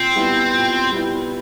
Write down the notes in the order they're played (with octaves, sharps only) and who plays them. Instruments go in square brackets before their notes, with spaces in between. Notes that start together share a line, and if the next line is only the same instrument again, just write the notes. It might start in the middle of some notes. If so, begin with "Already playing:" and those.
Already playing: [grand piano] A#2 [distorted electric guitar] C4
[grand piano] G3 B3 E4
A#2
G3 B3 E4